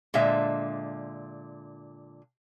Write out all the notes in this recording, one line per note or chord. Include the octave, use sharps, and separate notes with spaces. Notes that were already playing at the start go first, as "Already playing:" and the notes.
A#2 D3 G#3 E5